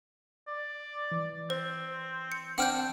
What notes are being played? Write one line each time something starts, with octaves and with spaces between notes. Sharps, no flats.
D5
E3
C4 C5
C#7
C4 D4 F#5 F6 G6